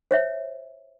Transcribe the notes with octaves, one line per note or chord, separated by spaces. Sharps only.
C5 C#5 E5